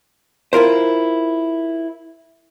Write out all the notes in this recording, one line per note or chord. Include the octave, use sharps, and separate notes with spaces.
E4 F4 A#4 C5